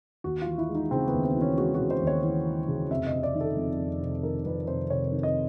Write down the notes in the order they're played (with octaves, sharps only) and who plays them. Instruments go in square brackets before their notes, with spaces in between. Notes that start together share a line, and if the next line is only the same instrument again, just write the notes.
[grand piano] D#2 F#4
E3 F4
E4
G#3
D#4
C#3 C4
B3
D#2
C4
E3
C#4
G#3 F#4
F#4
C#3
C5
D#2
C#5
E3
G#3
C#3
F1 E5
D#5
C3
D5
D#3
A4
F2
F1
C3
D#3 A#4
F2 B4
F1 C5
C3 C#5
D#3
D#5